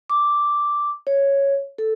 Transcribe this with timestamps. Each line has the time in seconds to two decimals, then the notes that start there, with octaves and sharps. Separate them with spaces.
0.10 D6
1.07 C#5
1.78 A4